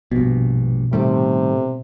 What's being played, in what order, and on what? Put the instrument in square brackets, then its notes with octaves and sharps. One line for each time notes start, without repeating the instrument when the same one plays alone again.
[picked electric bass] A#1 G2 [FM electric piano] B2
[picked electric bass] A2 D#3 G3 [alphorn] C3 [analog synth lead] A3